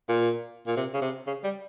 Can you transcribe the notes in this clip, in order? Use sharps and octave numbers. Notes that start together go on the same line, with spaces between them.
A#2
A#2
C3
C#3
C3
C#3
G3